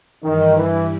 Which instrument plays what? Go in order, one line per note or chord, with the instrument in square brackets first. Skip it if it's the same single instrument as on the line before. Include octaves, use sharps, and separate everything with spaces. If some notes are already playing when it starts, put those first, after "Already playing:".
[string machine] G2 E3 G3 [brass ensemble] D#3
[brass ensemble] E3